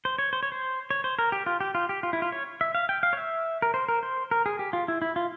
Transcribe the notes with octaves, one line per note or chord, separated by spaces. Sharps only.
C5
C#5
C5
C#5
C5
C#5
C5
A#4
G4
F4
G4
F4
G4
F4
E4
F4
C#5
E5
F5
G5
F5
C#5
E5
A#4
C5
A#4
C5
A#4
G#4
G4
F4
E4
E4
F4